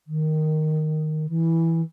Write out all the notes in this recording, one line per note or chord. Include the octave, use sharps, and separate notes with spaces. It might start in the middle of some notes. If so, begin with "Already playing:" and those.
D#3
E3